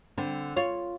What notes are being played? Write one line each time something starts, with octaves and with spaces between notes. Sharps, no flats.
D3 C4
F4 C#5